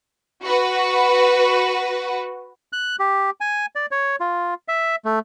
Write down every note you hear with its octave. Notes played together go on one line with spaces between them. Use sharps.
F#4 B4
F#6
G4
G#5
D5
C#5
F4
E5
A3